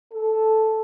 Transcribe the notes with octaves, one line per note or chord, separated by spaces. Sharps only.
A4